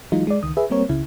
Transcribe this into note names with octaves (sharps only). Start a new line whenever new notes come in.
E3 F#3 G#3 D#4 F4
G#3 D5
C#2 D#3 D#6
G#4 B4 E5
G3 A#3 C4 A#4 C#5
C#2 C#3 E4